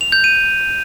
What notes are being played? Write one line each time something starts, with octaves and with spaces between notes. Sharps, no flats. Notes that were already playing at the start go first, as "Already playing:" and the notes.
F7
G6
D#7